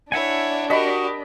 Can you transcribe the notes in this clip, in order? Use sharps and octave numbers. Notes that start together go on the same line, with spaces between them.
D4 E4 C#5 E5 F#5 G#5
F#4 G4 A#4 D#5 B5